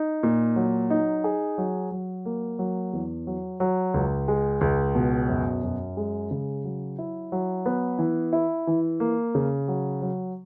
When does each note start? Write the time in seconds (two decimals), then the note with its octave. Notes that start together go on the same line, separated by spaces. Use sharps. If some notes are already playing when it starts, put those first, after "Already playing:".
Already playing: D#4
0.23 A#2
0.56 F#3
0.90 D#4
1.24 G#4
1.58 F#3
1.91 F#3
2.25 A#3
2.59 F#3
2.93 E2
3.27 F#3
3.60 F#3
3.94 C#2
4.28 G#3
4.61 C#2
4.95 B2
5.29 F#2
5.63 F#2
5.97 G#3
6.31 C#3
6.64 F#3
6.98 E4
7.32 F#3
7.66 B3
7.99 E3
8.33 E4
8.67 E3
9.00 A#3
9.35 C#3
9.68 F#3
10.02 F#3